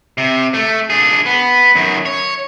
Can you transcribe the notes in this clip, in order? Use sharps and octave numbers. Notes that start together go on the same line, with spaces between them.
C3
A3
D4 G#4
B3
F#2 D#3
C#5